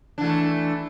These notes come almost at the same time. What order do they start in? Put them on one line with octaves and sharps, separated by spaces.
D4 E3 A3